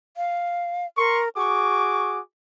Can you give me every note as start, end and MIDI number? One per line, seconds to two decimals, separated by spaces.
0.17 0.86 77
0.98 1.29 70
0.98 1.22 84
0.98 1.22 85
1.38 2.20 66
1.38 2.20 68
1.38 2.10 85
1.38 2.20 86